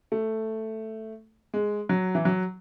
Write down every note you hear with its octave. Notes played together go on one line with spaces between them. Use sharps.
A3
G#3
F#3
E3
F#3